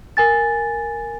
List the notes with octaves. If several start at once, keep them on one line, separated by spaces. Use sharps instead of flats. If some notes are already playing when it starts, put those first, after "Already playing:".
A#4 G#5 A6